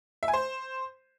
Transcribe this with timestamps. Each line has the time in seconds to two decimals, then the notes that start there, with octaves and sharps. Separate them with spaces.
0.23 E5
0.28 G#5
0.34 C5